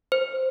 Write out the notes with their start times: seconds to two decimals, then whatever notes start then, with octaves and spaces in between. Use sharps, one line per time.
0.12 C5